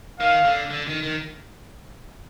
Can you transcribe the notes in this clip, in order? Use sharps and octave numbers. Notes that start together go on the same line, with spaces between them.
D#3 F5
D3
D3
D#3
D#3